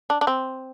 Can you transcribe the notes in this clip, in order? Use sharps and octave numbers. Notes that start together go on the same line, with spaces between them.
D4
D4
C4